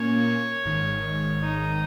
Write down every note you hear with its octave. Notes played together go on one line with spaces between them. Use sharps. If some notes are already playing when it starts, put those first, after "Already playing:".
Already playing: A#2 A#3 C#4 C#5
G#1 G#2 D#3
D#4